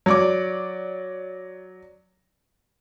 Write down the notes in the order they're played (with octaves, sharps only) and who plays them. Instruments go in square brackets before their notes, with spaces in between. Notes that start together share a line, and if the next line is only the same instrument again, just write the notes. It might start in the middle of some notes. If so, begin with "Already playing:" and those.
[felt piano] F#3 D5 D6